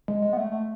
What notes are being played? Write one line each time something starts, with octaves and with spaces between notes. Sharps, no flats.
G#3
G#3
B3
A3
A3